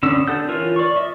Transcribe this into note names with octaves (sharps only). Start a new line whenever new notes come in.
D3 B3 C#4 E6
D3 A4 F#5 G6
E3 F4 A#4 B4 C#5
D5 C#6
D#5 E5